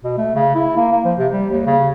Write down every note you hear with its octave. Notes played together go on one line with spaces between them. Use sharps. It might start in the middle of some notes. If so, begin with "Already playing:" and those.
B2
A3
C#3
E4
A#3
A#3
F3
C3
G3
D#2
C#3